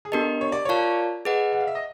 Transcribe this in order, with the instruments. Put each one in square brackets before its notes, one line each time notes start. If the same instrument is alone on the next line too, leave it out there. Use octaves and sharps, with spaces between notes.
[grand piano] G#4
[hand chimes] B3 D4 G4 A#4 D#5 [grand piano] A4
[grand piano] C#5
D5
[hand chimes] F4 A#4 D5 F5 A5 [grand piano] C#5
[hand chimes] G#4 B4 D#5 F#5
[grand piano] F#5
F5
E5
D#5